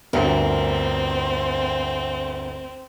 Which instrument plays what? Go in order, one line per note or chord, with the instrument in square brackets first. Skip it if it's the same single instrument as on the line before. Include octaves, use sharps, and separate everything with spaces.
[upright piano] G1 D2 [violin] C4 [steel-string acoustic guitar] A#4